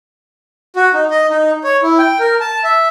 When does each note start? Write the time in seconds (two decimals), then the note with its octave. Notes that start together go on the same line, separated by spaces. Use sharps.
0.76 F#4
0.94 D#4
1.11 D#5
1.30 D#4
1.64 C#5
1.82 E4
1.99 G5
2.19 A#4
2.41 A5
2.64 E5